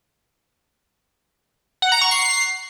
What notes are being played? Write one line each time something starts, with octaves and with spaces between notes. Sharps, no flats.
F#5
A#5
C#6
C7